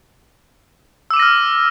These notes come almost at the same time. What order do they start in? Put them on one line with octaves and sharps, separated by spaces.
E6 D6 D#7 A#6 F6